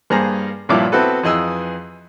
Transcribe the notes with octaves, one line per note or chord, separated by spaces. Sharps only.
G2 A#3 G#4 C5 A#5
G2 A#2 F3 E4 C#5 D6
B3 C4 E4 F#4 A4 B4
F2 E3 G#4 D#5 G#5 E6